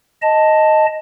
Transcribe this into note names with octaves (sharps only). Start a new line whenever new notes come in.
D#5 A5